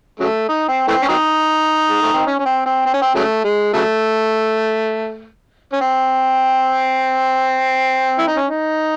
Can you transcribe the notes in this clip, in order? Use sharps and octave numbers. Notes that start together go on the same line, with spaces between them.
C#3 F#3 A3
D#4
C4
E3 A3 C4
C#4
F#3 C4 D#4
G#3
A3
C4
C#4
C#4
C4
C4
C4
C#4
C4
C#3 F#3 A3
G#3
C#3 F#3 A3
C#4
C4
E4
D#4
C#4
D#4